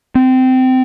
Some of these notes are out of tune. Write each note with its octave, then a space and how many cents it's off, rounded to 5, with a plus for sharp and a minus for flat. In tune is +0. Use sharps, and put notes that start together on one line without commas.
C4 -20